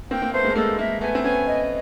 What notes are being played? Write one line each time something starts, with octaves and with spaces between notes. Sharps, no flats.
A#3 C4 G5
A#3 C4
A3 B3 C5
G#3 A#3
A3
G#3 A#3 A4
G#3 A#3 E5
A3 B3 G#5
C4
B3 C#4 G#5
D#5